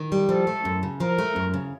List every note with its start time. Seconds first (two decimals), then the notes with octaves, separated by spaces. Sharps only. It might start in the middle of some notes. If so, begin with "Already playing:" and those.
Already playing: D#3
0.12 G3
0.29 F3 A4
0.47 A3
0.65 F#2
0.83 C#3
1.00 F3 A#4
1.18 A3
1.36 F#2
1.54 C#3